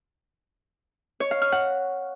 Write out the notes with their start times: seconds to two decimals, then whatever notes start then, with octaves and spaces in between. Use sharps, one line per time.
1.20 C#5
1.31 F5
1.42 F6
1.52 F#5